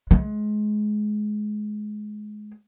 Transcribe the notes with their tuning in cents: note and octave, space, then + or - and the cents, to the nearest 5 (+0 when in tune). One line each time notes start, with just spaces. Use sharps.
G#3 +25